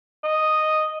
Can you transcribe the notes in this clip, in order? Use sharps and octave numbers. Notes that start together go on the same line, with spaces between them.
D#5